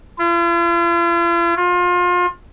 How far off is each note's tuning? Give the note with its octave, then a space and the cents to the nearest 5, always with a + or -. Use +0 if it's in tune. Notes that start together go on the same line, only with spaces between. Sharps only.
F4 -45
F4 +30